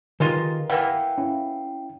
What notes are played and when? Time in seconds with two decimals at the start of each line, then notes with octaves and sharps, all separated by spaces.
0.20 D#3 G#3 D#4 F4 G4 A#4 B4
0.70 E3 A#3 B3 F5 G5
1.18 C#4 E4